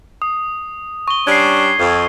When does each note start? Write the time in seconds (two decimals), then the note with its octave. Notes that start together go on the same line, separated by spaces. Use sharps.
0.22 D#6
1.08 C#6 G7
1.27 G3 C#4 D4 G#6 C7
1.80 F2